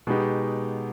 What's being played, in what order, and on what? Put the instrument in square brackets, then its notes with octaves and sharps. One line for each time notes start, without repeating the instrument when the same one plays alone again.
[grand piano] B2 G#3 B3 D#4 G4